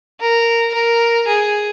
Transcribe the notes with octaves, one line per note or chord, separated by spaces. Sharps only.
A#4
A#4
G#4